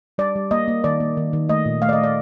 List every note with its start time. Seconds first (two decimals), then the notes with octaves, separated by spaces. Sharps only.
0.18 G3 D5
0.36 G3
0.51 A#3 D#5
0.68 A#3
0.84 D#3 D5
1.00 A#3
1.17 D#3
1.33 D#3
1.49 A3 D#5
1.66 A#2
1.82 A3 F5
1.89 D5
1.93 D#5
1.98 A3
2.04 D5